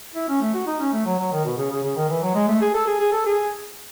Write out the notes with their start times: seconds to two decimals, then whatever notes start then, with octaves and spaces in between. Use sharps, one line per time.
0.15 E4
0.29 C#4
0.41 A3
0.54 F#4
0.67 D#4
0.80 C#4
0.93 A3
1.06 F#3
1.19 F#3
1.32 D#3
1.45 B2
1.58 C#3
1.71 C#3
1.84 C#3
1.96 D#3
2.09 E3
2.23 F#3
2.35 G#3
2.48 A3
2.61 G#4
2.74 A4
2.87 G#4
3.00 G#4
3.12 A4
3.26 G#4